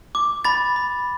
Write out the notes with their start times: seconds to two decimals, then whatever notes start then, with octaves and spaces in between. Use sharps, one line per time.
0.15 D6
0.45 B5 A6
0.76 B5